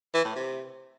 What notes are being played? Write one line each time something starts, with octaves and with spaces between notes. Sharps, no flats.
E3
A2
C3